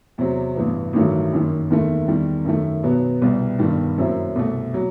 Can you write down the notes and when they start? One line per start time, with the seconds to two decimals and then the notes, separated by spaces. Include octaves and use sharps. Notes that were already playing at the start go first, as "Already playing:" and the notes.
0.18 E2 C3 F#3 C4
0.56 A1 G2 E3 B3
0.93 A1 G2 D#3 F#3 A3
1.32 F#1 F#2 D#3
1.70 F#1 E2 D#3 A3
2.08 E2 D#3 G3
2.45 F#2 D#3 A3
2.83 B1 B2 F#3 B3
3.22 C2 B2 G3 B3
3.59 G1 G2 D#3 G3
3.98 F#1 F#2 F#3 C4 E4
4.36 C2 B2 A3
4.74 F#3